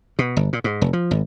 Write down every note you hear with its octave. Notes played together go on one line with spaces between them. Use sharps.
B2
G1
A#2
G#2
F1
F3
G#1